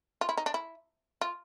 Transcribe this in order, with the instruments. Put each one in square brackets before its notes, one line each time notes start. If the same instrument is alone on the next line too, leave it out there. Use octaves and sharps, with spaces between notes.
[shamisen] F4
E4
D#4
D4
E4
F4